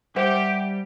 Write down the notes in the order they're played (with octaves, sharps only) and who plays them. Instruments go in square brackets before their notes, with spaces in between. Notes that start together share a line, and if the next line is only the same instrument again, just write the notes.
[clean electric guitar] G3 [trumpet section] G4 [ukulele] C5 E5 F#5